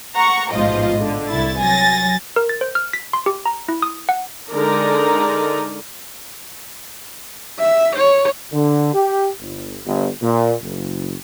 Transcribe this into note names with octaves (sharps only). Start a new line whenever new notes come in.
F#5 A#5 C#6
A1 G#2 B2 F3 F4 D#5
D3
C2 E4 A6
F#3 G#5 A6 A#6
A#4
A6
C5
F6
B6
C6
G4
A#5
E4
D#6
F#5
D3 G#3 D#4 A#4 D5 A#5
E5
C#5
D3
G4
G1
G1
A#2
F#1